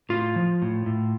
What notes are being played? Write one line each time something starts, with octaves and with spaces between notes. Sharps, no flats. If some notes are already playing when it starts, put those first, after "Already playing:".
A2 F4
F3
A2
A2